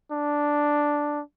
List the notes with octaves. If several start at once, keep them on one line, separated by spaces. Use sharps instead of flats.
D4